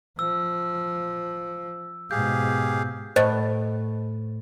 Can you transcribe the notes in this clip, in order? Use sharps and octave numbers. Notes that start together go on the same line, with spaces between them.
F3 E6
G#2 B2 G4 G#4 F5 G6
A2 C5 D#5